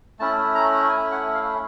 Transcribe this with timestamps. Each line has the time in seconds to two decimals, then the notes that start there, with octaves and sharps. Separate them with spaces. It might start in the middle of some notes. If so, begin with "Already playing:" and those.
0.19 A3 C#4 E4 A5
0.55 A#5
0.89 G#5
1.12 F#5
1.35 F5